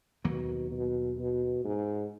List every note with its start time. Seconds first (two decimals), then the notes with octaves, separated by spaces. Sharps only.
0.24 D#2 B2 D#3 F#3 A#3
0.71 B2
1.18 B2
1.65 G#2